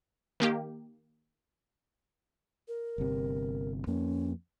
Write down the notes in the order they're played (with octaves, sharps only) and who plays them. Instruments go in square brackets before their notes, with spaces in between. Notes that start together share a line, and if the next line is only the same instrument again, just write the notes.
[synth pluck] D#3 A#3 G4
[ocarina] A#4
[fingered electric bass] G1 C3
[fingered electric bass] F2 A#3 [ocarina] C#4